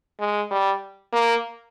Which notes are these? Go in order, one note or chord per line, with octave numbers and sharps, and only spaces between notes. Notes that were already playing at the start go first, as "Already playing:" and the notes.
G#3
G3
A#3